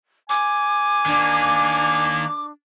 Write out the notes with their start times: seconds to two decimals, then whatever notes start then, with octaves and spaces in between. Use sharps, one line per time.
0.29 G#5 D6
1.06 D#3 A#3 D4